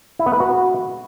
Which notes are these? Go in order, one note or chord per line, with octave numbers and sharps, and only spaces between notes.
E4
B3
B4
F#4